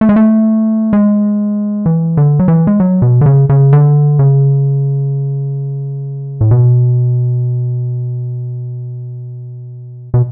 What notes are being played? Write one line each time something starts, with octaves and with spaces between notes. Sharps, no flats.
A3
G#3
A3
G#3
E3
D3
F#3
E3
G#3
F#3
B2
D3
C#3
C#3
D3
C#3
A2
B2
B2